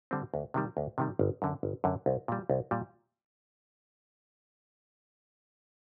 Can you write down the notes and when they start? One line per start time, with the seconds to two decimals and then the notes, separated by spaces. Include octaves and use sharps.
0.11 D3 G3 C4
0.34 D2
0.54 C3 D#3 G3
0.77 D2
0.98 C3 D#3 G3
1.19 G1
1.42 F#2 D3
1.63 G1
1.84 F#2 D3
2.06 C2
2.28 A#2 G3
2.50 C2
2.71 A#2 G3